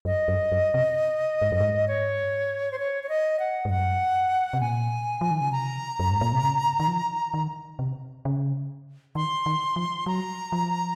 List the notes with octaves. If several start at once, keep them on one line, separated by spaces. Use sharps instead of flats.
F#2 D#5
F#2
F#2
C3
G#2
F#2
G#2
C#5
C5
C#5
C#5
D#5
F#5
G#2
F#2 F#5
C3
A#2 G#5
F3
D#3
C#3
C3 A#5
F#2
G#2
A#2
C3
C#3
D#3
F3
D#3
C3
C#3
D#3 C6
D#3
F3
F#3 A#5
F3